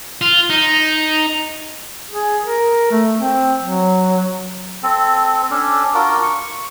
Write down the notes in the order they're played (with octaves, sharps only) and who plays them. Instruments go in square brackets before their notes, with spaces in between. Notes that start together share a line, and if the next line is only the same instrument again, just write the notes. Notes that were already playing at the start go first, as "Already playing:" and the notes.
[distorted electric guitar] F4
D#4
[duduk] G#4
A#4
A3
C4
F#3
[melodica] C4 A4
C#4 D4 A4
D4 F4 F#4 A#4
C#6